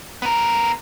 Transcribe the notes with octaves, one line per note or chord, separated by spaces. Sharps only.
B3 A#4